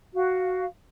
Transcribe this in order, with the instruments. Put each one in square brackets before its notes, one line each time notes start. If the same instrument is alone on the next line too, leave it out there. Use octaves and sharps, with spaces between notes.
[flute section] F#4 F5